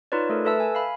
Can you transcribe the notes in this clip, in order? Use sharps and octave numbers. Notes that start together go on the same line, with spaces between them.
D#4 F4 B4 C#5 D5
A3 A4 A#4
A4 B4 E5 A5 E6
G#5
F5 B5